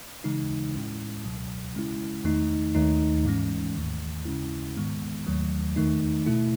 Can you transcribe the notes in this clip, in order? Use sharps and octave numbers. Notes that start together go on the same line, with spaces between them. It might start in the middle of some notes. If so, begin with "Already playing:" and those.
C#3 E3 G#3 D#4
A2 G#3 C#4 E4
C#2 B2 F#3
C#3 G#3 C#4 E4
E2 D#3 A3 D#4
D#2 D#3 A3 D#4
G#2 E3 G#3 C#4
D#2 D#3 A3
D#2 C#3 G#3 C#4 E4
G#2 D#3 G#3 B3
D#2 D#3 F#3 A3
E2 D#3 A3 D#4
B2 A3 E4